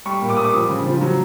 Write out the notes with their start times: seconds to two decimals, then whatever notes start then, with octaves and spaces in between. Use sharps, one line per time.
0.05 G3 C#6
0.21 A#2
0.30 D6
0.37 G3 D#6
0.44 D6
0.53 F3 D#6
0.70 C#3
0.86 F3
1.02 F#3